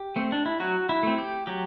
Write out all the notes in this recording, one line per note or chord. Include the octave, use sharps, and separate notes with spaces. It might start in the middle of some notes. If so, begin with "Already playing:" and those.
Already playing: G4
A3 C4
D4
E4
F#3 F#4
E4
A3 C4
G4
F#3 G4